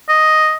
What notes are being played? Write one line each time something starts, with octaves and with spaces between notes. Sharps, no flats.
D#5